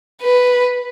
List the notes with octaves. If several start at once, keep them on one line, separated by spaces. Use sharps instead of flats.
B4